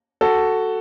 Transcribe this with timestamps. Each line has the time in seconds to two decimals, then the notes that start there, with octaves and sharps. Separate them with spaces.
0.21 F#4 A4